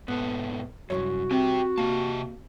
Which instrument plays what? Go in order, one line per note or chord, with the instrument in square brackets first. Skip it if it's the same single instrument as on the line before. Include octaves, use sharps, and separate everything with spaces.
[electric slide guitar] G#2 B2 A4 [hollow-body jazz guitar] B3
[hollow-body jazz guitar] C2 C3 C#5 [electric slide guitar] F#2 [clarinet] F#4
[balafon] C4 [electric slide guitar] G4 C5 G5
[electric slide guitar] C3 G4 A5 [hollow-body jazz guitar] A#3